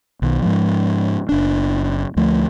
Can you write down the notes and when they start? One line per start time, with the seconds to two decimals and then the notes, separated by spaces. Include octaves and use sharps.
0.22 B1 D#3
0.42 G#2 F3
1.29 F#1 D4
2.16 D2 F3 A3